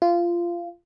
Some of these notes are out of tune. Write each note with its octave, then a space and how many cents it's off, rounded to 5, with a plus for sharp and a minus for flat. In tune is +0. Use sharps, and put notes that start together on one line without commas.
F4 -20